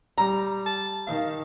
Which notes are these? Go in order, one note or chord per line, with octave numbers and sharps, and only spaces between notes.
G3 A#5
A5
D#3 F5